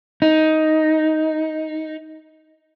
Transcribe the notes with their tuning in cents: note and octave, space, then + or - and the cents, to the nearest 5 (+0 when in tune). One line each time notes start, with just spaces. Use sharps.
D#4 +10